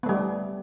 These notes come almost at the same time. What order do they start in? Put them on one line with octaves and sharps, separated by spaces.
B3 A3 G3